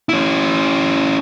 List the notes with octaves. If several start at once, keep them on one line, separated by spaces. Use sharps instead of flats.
C#4 E4